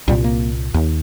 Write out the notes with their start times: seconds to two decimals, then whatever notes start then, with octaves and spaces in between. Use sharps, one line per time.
0.08 C2 A#2 G3
0.24 A#3
0.74 D#2